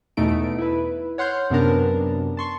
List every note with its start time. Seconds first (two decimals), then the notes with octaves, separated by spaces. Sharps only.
0.17 E2 B2 A3 D#4 D7
0.58 E4 B4
1.18 C#5 F#5 C6 F6 G6
1.50 F#2 C3 B3 D4 A#4 A5
2.37 A5 C6 C#6